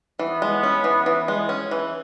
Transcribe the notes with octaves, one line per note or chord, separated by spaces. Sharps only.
E3 B3
G#3
C#4
E3
E3
G#3
C#4
E3